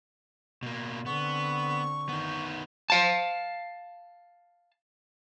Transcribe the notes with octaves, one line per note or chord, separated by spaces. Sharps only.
B2 A#3
D3 B3 C4 C#6
D#3 B3
F5 A5